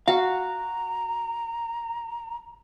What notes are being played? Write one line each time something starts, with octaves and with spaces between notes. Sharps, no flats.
F#4 F5 A#5